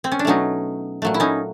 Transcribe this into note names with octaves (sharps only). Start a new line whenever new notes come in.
C4
C#4
D4
B2 F#3 A3 C#4 D#4
A#2 F#3 A3
E4
C#4 D#4